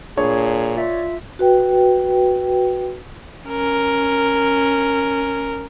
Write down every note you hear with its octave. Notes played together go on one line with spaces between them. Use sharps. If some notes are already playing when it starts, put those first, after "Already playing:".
A#2 D4 G#4 C#5
F4 D5 E5
F#4 B4 G5
C#4 A#4